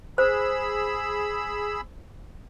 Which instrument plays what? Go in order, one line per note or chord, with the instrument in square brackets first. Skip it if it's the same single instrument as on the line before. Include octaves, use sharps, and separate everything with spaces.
[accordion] G#4 B5 E6 [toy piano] C5